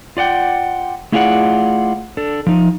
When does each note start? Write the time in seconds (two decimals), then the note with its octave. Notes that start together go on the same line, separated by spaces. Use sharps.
0.17 F4 D5 F#5 G5
1.12 A3 E4 F4 G#4 D5 F#5
2.17 D4 A4
2.47 F3 D#4